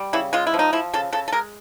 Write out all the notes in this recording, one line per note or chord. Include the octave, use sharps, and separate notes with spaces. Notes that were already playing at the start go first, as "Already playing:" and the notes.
Already playing: G3
C#3 E4
G#3 F4
E4
F3
D#4
F3 E4
C#3 A4
C#3 A4
A4
G#3 A#4